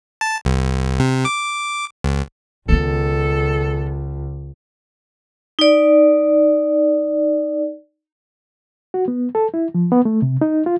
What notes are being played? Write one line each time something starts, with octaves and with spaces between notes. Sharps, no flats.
A5
C2
C3
D6
C#2
C#2 D#3 B3 A4
D#4 D5
F#4
B3
A4
E4
F3
B3
A3
C3
D#4
F4